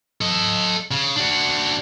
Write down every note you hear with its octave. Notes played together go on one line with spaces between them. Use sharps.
A4 D#5
C#3
D4 F#4